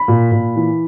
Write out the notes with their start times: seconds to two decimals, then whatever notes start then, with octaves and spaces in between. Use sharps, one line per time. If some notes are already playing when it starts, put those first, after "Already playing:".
Already playing: B5
0.08 A#2
0.32 A#2
0.56 E3